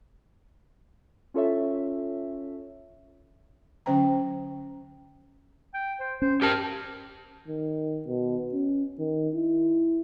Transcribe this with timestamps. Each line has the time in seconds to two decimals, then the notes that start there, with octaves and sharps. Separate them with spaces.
1.34 C#4 F4 A4 C#5 E5
3.86 D3 F#3 C#4 C5 G5 A#5
5.74 G5
6.00 C5
6.22 C#4 C5
6.42 G4 A#4 A5
7.48 D#3
8.06 B2
8.53 C#4
8.99 D#3
9.35 E4